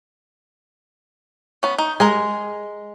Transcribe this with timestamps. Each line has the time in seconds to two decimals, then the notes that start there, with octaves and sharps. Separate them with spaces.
1.63 B3 C#4
1.78 D#4
2.00 G#3 A#4 D#5 G#5